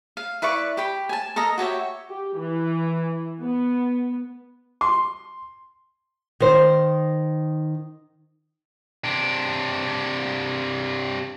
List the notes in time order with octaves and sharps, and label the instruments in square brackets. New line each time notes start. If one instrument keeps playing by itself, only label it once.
[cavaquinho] F5
E4 B4 D5 C#6
G4 G5 B5
G#5 A5
A4 A#4 D#5 A#5
F#4 G4 C#5 E5
[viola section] G4
E3
B3
[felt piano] C6
[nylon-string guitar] D#3 C5
[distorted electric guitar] C3 D4